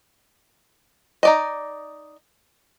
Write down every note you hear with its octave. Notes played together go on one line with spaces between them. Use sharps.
D#4 D5 D#5